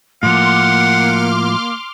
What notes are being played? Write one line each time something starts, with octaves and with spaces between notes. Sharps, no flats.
A2 F3 A#3 F#5 C6 D6 F6